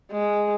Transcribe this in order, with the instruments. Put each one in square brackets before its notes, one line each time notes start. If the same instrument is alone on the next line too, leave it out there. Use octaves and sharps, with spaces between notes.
[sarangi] G#3